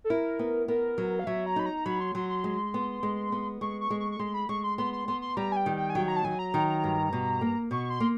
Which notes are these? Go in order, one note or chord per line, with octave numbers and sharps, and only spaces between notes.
A4
E4 A#4
B3
B3 A#4
F#3
F5
F#3 E5
A#5
D#4 B5
A#5
F#3 B5
C6
F#3 C6
C6
G#3
B3
G#3
B3
G#3 C#6
C#6
G#3
C#6
C#6
G#3 C6
B5
G#3 C#6
C6
B3 C6
C6
B3 C6
C6
G3 A#5
G#5
G5
D#3
G5
G#5
F#3 G5
A#5
A5
F#3 G#5
A#5
D#3
G2
B2
A#3
B2 C#6
C6
A#3